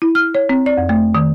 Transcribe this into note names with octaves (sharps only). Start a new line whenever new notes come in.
E4
F6
C#5
C4
D5
F2
A3
D#3